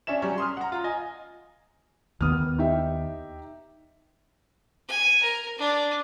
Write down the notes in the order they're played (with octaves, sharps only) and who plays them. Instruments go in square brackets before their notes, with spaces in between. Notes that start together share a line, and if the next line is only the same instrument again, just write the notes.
[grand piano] C#4 D4 E5 E7
F#3 G3 C#4
C6 D#6 F6
F#5 A#5
F4
D#5 G#5
[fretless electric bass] D#2 D#3 B3 [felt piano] D#6 F6
[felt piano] D#4 G4 E5
[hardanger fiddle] G#5
A#4
D4